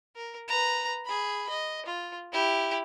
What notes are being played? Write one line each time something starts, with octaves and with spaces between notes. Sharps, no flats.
A#4
B4 A#5
G#4 B5
D#5
F4
E4 G4